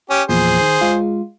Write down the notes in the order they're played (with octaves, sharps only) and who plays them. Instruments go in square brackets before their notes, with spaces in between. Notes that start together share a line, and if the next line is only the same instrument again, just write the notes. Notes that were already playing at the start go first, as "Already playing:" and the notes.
[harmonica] C#4 G4
[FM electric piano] E2 A#2 F3 [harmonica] G#4 C5
[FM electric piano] D#3
G#3 F4